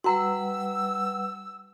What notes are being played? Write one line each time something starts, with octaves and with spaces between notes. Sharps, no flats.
G3 F#4 B4 F#5 A#5 E6